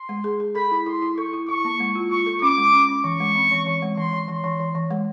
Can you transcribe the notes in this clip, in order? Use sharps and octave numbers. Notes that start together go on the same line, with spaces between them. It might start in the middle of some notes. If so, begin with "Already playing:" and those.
Already playing: C6
G#3
G#4
G#4
A4 B5
E4
E4 C6
E4
A4 C#6
E4
E4 C#6
A#3
G#3
F4
F4 C#6
A4
C#4 D6
G#3
C#4
C#4
E3 C#6
G#3
C4
E3
E3
G#3
E3 C6
E3
E3 C6
E3
E3
E3
G#3